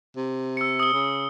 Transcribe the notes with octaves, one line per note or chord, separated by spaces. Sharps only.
C3
E6 C#7
D#6 G7
C#3